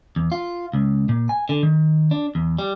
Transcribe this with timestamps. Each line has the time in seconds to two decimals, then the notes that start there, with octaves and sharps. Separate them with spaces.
0.16 E2
0.32 F4
0.73 C#2
1.09 A#2
1.29 G#5
1.49 D3
1.63 D#3
2.11 D4
2.35 E2
2.59 G3